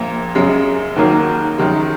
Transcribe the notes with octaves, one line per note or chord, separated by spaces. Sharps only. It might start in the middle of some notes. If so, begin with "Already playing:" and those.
Already playing: A#1 A#2 A#3
F#2 C#3 G#3
D#2 D#3 F#3 A#3
F#2 D#3 G#3